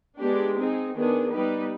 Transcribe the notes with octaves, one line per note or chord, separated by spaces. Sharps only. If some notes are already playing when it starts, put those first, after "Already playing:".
G#3 B3 D4 G4
C4 D#4 G#4
D#3 B3 D4 G#4
G3 B3 D#4 G4 B4